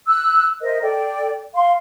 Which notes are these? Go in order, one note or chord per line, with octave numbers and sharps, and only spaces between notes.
E6 F#6
A#4 C5 D#5 E5
A4 D5 G5
F5 C6